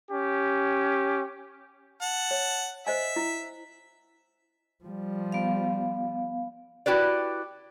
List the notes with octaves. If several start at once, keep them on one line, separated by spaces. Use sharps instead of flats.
C#4 G4
F#5 A5
C#5
C5 D#5 E5 G#5
E4
F3 G3
B3 F5
E4 F#4 G4 B4 D5